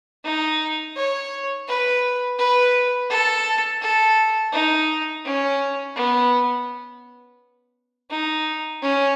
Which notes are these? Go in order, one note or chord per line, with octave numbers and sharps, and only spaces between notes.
D#4
C#5
B4
B4
A4
A4
D#4
C#4
B3
D#4
C#4